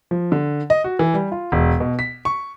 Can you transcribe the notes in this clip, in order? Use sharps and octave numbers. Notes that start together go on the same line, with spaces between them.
F3
D3
D#5
F#4
E3
G3
F4
E1
B2
B6
C#6